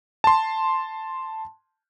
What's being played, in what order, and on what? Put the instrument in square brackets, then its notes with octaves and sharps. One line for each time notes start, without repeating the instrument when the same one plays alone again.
[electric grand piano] A5 C6